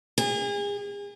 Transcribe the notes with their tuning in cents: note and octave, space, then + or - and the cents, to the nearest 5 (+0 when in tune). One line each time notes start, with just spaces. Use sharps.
G#4 -35